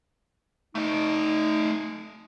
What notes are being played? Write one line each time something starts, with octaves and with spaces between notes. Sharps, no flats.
A3 D#4 D#5